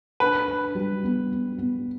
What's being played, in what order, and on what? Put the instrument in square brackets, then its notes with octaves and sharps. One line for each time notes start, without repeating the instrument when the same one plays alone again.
[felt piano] D4 [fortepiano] B4
[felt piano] D4
G3
B3
B3
B3